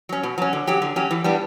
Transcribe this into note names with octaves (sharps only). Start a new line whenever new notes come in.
F#3 C#4
B2
F#3 C#4
D3
F#3 C#4 G4
D3
F#3 C#4 G4
E3
G3 B3 D4